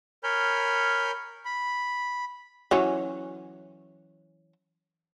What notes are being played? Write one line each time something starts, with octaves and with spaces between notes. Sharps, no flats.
A#4 C#5 G#5 B5 F6 G6
B5
E3 F#3 C#4